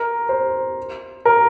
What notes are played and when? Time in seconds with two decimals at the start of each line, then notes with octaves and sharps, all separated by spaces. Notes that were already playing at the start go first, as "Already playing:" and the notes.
Already playing: A#4
0.29 C5
1.25 A#4